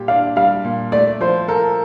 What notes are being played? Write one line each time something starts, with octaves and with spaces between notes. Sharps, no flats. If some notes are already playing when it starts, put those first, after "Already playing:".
Already playing: A#2 G3 G4
D4 F5
G3 F5
A#2
A3 D5
F3 C5
A4 A#4